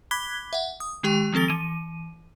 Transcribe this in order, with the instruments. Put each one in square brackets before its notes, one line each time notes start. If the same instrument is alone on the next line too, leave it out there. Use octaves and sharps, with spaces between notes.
[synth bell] B5 D6 F#6 G#6 B6 G7
E5 F#5
D#6
D#3 G#3 G4 G5
D#3 F3 C4 A4 A6
E3 D#7